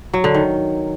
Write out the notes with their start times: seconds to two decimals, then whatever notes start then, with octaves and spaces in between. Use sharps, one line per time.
0.14 F#3
0.24 D3
0.34 D#3